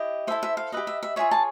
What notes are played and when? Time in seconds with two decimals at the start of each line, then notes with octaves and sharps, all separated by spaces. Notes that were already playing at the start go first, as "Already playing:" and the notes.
Already playing: E4 G4 D#5
0.27 E4 A4 C5 E5
0.43 E5
0.57 F5
0.72 G4 B4 D#5 E5
0.87 E5
1.03 E5
1.16 F4 G#4 C#5 E5
1.31 A5